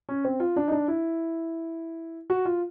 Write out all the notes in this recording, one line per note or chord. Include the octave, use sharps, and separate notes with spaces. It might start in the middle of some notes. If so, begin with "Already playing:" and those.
C#4
C4
F4
D4
D#4
D4
E4
F#4
F4